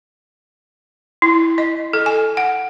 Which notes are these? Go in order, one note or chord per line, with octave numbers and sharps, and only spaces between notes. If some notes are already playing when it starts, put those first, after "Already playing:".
E4
D#5
A4
G#5
F#5